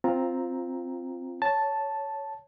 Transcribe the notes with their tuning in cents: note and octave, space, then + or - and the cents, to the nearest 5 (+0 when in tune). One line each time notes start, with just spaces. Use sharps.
C4 +0 F4 +0 A#5 +0
C#5 +10 A5 +0